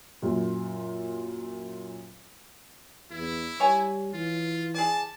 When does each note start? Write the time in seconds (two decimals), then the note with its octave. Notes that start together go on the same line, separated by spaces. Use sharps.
0.22 F#2 A#2
3.11 E2 E4
3.60 G3 C#5 G#5
4.13 E3 F4
4.74 G#4 D5 A5